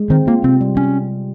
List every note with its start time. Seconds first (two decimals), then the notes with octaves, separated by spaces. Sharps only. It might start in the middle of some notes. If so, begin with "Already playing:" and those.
Already playing: G#3
0.10 D#3 C4
0.27 A#3 F4
0.44 C3 C4
0.61 G3
0.77 C#4